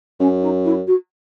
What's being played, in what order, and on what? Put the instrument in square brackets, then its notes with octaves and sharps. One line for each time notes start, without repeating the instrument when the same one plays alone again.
[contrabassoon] F#2 [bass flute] C#4
[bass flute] D#4
E4
F#4